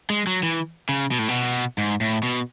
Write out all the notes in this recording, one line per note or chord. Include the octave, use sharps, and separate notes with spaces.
G#3
F#3
E3
C#3
B2
A2
B2
G#2
A2
B2